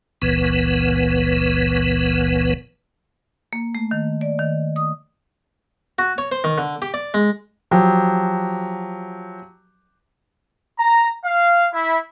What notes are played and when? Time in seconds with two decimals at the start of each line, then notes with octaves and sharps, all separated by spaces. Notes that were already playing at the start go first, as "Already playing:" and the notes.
0.22 F#1 C#2 A#2 E3 B3 B4
3.53 A#3
3.75 A3
3.91 D#3
4.21 D5
4.39 D#3
4.76 D#6
5.99 F#4
6.18 C#5
6.32 C5
6.44 D#3
6.58 D3
6.82 G4
6.94 D5
7.14 G#3
7.71 F3 F#3 G4
10.78 A#5
11.23 F5
11.72 E4